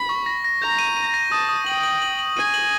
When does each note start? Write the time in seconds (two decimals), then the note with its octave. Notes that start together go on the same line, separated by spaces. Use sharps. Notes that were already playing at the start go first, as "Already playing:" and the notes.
Already playing: B5
0.09 C#6
0.26 A#6
0.44 A#6
0.62 A#5 G6
0.78 D#7
0.97 D#7
1.14 A#6
1.31 A5 D#6
1.49 D#6
1.66 G5 F#7
1.83 F#7
2.02 F#7
2.19 F#7
2.37 G#5 D#7
2.54 F#7